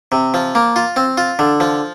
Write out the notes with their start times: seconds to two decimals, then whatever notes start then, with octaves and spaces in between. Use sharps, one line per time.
0.12 C3
0.34 F3
0.55 A#3
0.76 F4
0.96 C4
1.18 F4
1.39 D3
1.60 F3